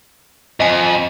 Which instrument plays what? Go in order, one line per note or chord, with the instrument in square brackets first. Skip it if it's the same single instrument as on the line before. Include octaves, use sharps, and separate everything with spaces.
[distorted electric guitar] F2 [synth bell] D#5 G#5